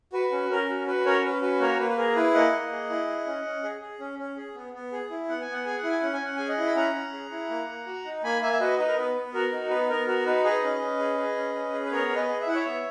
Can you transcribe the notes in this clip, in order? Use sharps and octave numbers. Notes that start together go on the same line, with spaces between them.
F#4 B4
C#4
C#4 A#4
F#4
F#4 B4
C#4 A#4 C#5
C#4 B4
F#4 B4
A#3 A#4 C#5
A#3 B4
B4
G#4 A#4
E4 B4
A#3 D#5 F#5
A#3
G#4
E4
G#4
C#4
C#4
G#4
G#4
C#4
C#4
G#4
B3
B3
G#4
E4
B3 F#5
G#5
B3
F#5
G#4 G#5
F#5
E4
G#5
C#4 F#5
G#5
C#4 F#5
G#4 G#5
D#5 F#5
E4
B5
C#4 F#5 A#5
C#4
G#4
E4
A#3
A#3
F#4
D#4
A#3 G#5 B5
A#3 E5 G#5
E5
F#4 B4 D#5
D#4 B4 D#5
A#4
B3 B4
B3
F#4 A#4
D#4
B3 B4
B3 A#4
F#4 A#4
D#4 B4
G#4 B4 D#5
C#4
C#4
G#4
G#4
C#4
C#4
G#4
B4
B3 A#4 C#5
B3
B4 D#5
G#4
E5
E4 F#5
C#5 E5
B3